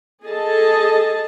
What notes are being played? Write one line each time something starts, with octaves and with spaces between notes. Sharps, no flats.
G#4 A4 D#5 A5